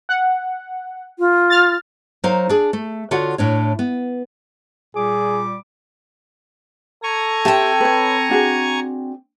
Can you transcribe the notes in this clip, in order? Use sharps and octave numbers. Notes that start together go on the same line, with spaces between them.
F#5
F4
F6 A6
F#3 D#4 A#4 C5 F5
D4 G#4
A3
D3 F4 F#4 C#5 F#5
A2 D4 C#5
B3
A#2 G3 G#4 D6
A4 G#5 A#5 C#6
C4 G4 E5 G5 A5
B4 C#5
D4 F#4 G#4